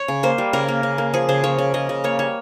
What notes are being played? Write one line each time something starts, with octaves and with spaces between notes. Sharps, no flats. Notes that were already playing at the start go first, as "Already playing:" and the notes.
Already playing: C#5
C#3
A#3 C5
G3
C#3 A#4
A#3
C#3
A#3
F3 G#4
C#3 C5
A#3 C#5
C#3
C#3 D#5
C#3
A#3 C#5
G3 C#5